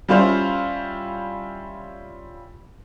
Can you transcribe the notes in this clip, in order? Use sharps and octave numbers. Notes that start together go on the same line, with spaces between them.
G3 C#4 E4 F4 C5